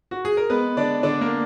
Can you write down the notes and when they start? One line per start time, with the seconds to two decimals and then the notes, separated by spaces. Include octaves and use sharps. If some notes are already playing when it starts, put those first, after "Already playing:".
0.11 F#4
0.25 G#4
0.37 A#4
0.50 G#3 B3 B4
0.77 D3 D4 D5
1.03 D3 D4 D5
1.21 A#3 A#4